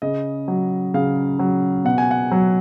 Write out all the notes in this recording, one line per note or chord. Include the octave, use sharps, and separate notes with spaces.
C#3 D#5
F#3
C#3 F5
F#3
B2 F#5
G#5
F#5
F#3